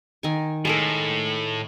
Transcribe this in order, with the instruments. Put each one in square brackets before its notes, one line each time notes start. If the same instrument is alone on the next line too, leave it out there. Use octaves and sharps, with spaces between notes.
[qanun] D#3 G#5
[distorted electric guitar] A2 [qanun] G#3 A4 A#4